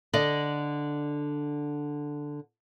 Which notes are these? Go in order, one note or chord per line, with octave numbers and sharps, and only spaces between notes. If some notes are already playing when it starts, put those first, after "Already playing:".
D3 D5 D#5